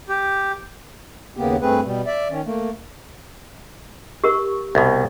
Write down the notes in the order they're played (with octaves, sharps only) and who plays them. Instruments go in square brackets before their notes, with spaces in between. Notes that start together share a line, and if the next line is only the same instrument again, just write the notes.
[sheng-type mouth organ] G4
[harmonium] D#2 C#3 A#3 B3 G4
G2 A3 C4 G#4 B4
B2 G3
D5 E5
D#3 C#4
A3 A#3
[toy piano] G4 A#4 C#6
[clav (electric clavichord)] C2 B2